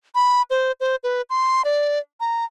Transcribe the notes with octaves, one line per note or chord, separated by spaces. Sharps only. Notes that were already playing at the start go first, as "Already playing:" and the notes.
B5
C5
C5
B4
C6
D5
A#5